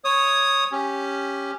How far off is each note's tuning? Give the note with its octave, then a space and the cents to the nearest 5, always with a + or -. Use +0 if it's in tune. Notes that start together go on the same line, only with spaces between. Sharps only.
C#5 +0 D#6 +0
C#4 +0 G4 +0